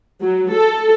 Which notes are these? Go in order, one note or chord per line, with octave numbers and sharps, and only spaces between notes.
F#3
A4